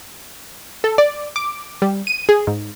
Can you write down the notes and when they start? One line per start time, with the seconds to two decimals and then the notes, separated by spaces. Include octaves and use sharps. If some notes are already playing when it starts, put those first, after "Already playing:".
0.84 A4
0.98 D5
1.36 D6
1.82 G3
2.07 D#7
2.29 G#4
2.47 G#2